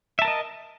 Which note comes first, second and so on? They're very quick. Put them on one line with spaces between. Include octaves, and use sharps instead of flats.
E5 A5 A#4 D#5